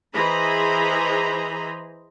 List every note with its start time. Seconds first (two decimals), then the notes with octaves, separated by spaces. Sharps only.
0.13 E3 G#4 C5 D#5 A#5 B5